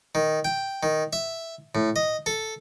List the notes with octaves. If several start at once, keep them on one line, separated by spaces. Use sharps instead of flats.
D#3
G5
D#3
E5
A2
D#5
A4